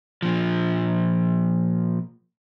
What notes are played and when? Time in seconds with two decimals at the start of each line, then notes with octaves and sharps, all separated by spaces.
0.22 A#2 F3